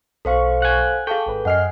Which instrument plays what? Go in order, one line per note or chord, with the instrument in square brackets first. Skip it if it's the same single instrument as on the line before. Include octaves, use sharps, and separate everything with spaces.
[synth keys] B1 C#6 [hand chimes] A4 C5 F5
[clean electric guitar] F#5 G#5
[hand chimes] G#4 A4 [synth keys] F5 A5 C#6 [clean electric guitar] G5
[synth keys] G#1 B4
[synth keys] F#2 D#5 F6 [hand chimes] F#5 G#5 C7